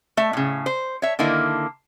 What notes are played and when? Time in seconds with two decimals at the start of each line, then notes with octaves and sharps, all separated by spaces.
0.17 A3 E5
0.33 A2 C#3
0.66 C5
1.02 C#5 E5
1.19 D3 D#3 A#3 E4